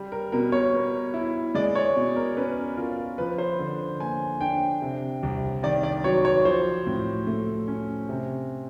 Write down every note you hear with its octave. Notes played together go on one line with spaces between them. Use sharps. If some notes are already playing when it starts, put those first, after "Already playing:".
Already playing: G3
A#4
B2 A#4
C#5
B3
E4
G#3 D5
C#5
B2
A#4
C#4 B4
F4 A#4
F3 B4
C5
D3
A#3 G#5
D4 G5
C3
C2
D#3 D5
D5
F#3 C#5
C#5
F3 C5
A2
A3
C#4
C3